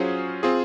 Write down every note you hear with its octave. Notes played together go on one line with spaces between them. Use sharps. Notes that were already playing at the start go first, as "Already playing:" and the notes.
Already playing: F#3 C#4 F4 G#4 C5
C4 F4 G#4